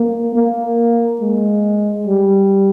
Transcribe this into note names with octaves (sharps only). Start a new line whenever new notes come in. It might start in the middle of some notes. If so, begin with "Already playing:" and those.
Already playing: A#3
A#3
G#3
G3